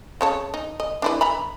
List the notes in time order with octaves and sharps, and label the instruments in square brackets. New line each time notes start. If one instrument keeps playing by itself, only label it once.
[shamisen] C#3 C#5 A5
D#4
D#5
D4 E4 B4
E5 A#5 B5